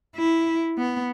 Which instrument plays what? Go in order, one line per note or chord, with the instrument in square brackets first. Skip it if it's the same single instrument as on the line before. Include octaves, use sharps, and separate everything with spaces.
[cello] E4
B3